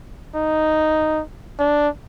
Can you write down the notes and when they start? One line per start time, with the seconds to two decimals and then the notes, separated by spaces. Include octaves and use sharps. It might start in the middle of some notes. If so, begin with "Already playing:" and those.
0.35 D#4
1.59 D4